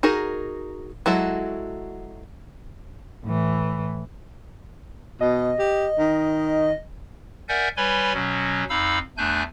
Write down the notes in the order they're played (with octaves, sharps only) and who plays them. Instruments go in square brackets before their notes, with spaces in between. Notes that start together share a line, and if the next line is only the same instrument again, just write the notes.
[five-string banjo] D#4 F#4 G#4 A#4
F#3 G#3 E4 F#4 A4
[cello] A2 E3
[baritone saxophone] B2 [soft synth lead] D#5
[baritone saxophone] G4
D#3
[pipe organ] A#4 D5 E5 F#5 G#5 G6
G3 B4 C#5 G#5 B5 C6
B2 F#3 C#4
F2 D#4 F5 B5 E6
E2 A3 D4 G#5 F#6 G6